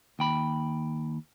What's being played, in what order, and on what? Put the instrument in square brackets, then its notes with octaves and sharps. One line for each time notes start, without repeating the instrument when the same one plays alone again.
[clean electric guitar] D#2 G5 B5